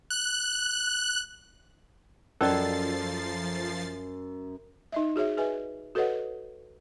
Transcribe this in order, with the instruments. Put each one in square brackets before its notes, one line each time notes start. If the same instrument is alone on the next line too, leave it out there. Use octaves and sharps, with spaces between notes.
[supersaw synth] F#6
[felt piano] F#2 [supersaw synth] F3 A6 C7 [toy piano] C#4 D5 D#5 [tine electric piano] A4
[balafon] D#4 D#5 E5
F#4 G#4 C#5 E5
G#4 B4 D#5 E5 G#5
F#4 A4 B4 C#5 D#5 F#5